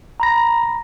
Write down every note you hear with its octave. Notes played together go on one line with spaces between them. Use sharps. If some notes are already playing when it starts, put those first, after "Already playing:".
A#5 B5 A#6